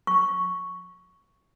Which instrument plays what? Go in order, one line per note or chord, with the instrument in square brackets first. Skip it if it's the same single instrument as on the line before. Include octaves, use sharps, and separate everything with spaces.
[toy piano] C#6